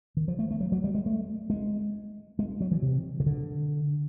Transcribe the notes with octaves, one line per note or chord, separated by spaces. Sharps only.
D#3
F3
A3
A3
F#3
F#3
G3
G#3
A3
G#3
G#3
F#3
E3
C3
C#3
D3